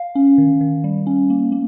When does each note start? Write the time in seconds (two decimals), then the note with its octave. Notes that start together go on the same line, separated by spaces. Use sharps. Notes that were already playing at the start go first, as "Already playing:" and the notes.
Already playing: F5
0.15 C#4
0.38 D#3
0.61 D#3
0.84 G3
1.07 C#4
1.30 A#3
1.52 A#3